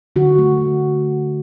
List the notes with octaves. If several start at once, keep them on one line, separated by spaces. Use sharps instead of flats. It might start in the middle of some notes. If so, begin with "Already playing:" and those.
D3 F#4
A3